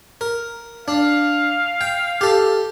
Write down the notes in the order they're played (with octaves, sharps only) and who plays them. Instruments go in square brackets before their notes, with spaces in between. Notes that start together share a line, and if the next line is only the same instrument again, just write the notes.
[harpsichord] A#4
[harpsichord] D4 [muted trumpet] F5
[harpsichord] G5
G4 A4